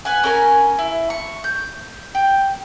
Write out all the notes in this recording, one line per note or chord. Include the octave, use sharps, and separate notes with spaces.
B4 F#5 G#5
C#4 A#4 G#5
E4
C#6
G6
G5